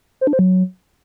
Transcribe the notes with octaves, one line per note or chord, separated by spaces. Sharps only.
C5
D4
C5
F#3